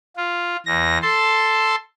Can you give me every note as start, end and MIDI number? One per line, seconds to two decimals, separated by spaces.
0.17 0.56 65
0.66 0.98 40
0.66 0.98 94
1.02 1.75 69
1.02 1.75 81
1.02 1.75 84